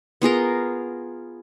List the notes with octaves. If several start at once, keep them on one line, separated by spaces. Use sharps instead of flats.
B3 F4 G#4 A#4